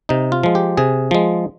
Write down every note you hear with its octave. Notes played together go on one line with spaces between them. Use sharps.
C3 D#4
F4
F3 G#3
G4
C3 G#4
F3 G#3